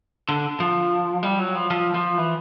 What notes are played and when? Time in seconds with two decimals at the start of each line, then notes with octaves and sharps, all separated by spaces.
0.29 D3
0.60 F3
1.23 G3
1.39 F#3
1.55 F3
1.70 F3
1.94 F3
2.18 E3